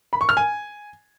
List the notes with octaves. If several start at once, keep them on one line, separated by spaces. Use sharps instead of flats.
B5
C#6
F6
G#5